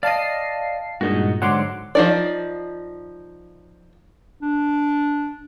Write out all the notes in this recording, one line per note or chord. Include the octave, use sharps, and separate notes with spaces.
D5 D#5 F5 A5 C7
G2 A#2 G#3 D#4 F#4
G#2 D3 F#3 F#5 C6 D6
F3 D#4 D5
D4